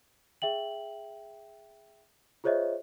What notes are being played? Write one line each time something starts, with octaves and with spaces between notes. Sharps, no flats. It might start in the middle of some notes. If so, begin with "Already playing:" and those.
G#4 E5 G5 F#7
F4 G#4 C5 C#5 D#5 E5